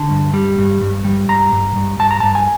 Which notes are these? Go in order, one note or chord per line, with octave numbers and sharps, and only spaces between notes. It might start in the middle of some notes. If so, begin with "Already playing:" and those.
Already playing: D3 A5
G2
G3
G2
G2
G3
G2 A#5
G2
G2
G2 A5
A#5
G2 A5
G#5